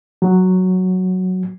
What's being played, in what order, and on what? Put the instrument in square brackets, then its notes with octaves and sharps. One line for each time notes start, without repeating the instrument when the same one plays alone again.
[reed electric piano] F#3